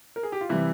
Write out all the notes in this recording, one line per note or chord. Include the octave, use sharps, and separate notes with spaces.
A#4
G#4
G4
F4
C3 E3 G3 E4